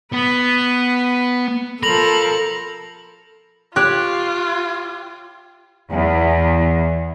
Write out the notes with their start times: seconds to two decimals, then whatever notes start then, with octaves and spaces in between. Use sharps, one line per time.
0.12 B3 B4
1.83 F3 A4 A#4 B5 A#6 F7 F#7
3.76 F4 G4 C#5 F#6
5.91 E2